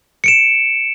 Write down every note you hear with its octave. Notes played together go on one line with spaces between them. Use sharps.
C#7 D7 E7